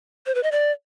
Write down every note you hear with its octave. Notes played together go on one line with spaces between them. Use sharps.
C5
B4
D#5
D5